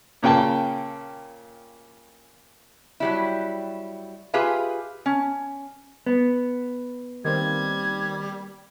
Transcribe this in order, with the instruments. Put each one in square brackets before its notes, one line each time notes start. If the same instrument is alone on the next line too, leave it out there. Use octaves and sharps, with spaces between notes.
[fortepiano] A#2 C#3 A#3 G5 A5
[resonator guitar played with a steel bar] F#3 G3 E4
F4 G4 G#4 B4 E5 F5
C#4
[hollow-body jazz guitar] B3
[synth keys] D#3 A#3 C4 [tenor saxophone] G3 [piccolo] G#6